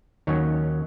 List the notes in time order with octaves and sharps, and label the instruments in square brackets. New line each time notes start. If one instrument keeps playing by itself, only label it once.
[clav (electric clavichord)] D#2 D#3 F#3 C#4 C#5